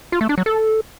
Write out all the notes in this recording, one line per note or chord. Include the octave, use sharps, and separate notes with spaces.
F4
A3
D4
F#3
A4